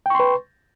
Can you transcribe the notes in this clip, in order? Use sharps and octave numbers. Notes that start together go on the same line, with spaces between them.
B4 G5 C6 C#6